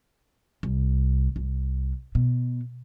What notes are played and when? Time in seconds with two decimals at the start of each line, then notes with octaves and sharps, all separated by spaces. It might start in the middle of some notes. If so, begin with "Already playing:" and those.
0.63 C2
1.36 C2
2.15 B2